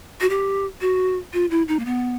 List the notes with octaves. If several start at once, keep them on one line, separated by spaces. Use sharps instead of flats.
F#4
G4
F#4
F4
E4
D#4
A#3
B3